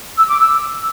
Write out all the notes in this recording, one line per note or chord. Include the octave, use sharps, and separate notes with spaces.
E6
D6
E6